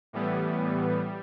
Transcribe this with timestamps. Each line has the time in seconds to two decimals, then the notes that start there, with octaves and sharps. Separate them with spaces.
0.13 A2 E3 G3 B3
0.91 G3